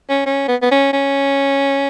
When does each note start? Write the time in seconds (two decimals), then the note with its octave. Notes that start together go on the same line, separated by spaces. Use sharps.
0.09 C#4
0.26 C#4
0.48 B3
0.62 B3
0.71 C#4
0.93 C#4